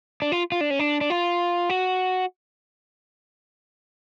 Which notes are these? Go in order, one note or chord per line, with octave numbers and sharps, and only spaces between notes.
D4
F4
F4
D4
C#4
D4
D4
F4
F#4